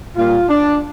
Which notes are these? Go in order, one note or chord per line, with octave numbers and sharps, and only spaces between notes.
A#2 G3 A#3 F4
D4